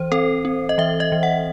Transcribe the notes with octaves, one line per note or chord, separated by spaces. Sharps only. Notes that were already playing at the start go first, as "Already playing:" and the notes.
Already playing: E3 C5
C4 A4
C4
D#5
E3 E5
D#5
E3
F#5